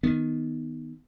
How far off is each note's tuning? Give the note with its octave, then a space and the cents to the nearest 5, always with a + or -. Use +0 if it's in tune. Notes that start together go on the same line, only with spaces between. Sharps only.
D#3 +0 B3 -5